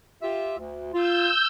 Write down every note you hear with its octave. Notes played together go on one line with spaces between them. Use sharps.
F4 G4 E5
D2
F4 E6 G6